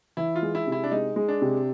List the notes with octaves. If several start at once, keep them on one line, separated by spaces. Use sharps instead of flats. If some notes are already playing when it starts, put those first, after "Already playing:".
E3 E4
F4
G#3
E4
C3
E4
D4
G#3 D#4
G#3
D4
C3